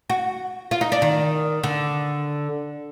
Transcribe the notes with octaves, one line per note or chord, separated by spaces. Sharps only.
F#4
F4
D#4
D4
D#3
D3